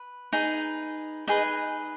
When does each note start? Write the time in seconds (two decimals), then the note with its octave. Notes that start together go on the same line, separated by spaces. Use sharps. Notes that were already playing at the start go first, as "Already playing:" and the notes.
Already playing: B4
0.33 D#4 G#4 B4
1.28 D#4 G#4 B4 D#5